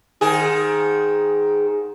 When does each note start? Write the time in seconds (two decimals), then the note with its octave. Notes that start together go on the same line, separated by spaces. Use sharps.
0.21 G#2 D#3 G#4